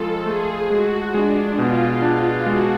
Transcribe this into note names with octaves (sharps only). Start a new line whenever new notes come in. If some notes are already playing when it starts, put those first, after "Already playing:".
Already playing: F2 G#3 F4 A4
A3 G#4
G#3 F#4
G#3 D4
B2 F4
D4 F4
G#3 F#4